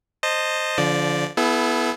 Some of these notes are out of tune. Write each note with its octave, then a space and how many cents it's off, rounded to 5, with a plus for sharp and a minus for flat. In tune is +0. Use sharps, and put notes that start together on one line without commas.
C5 +0 D#5 -10 A5 +15
D3 -35 F3 -10 D5 +0
B3 +0 E4 +10 A4 -40